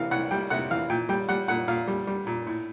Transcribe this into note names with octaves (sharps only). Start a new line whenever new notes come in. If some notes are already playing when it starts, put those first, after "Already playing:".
Already playing: C3 E3 F5
C2 F#5
G3 G5
C3 F#5
E3 F5
A#2 G5
G3 G5
G3 F#5
A#2 F#5
A#2 F5
G3
G3
A#2
A2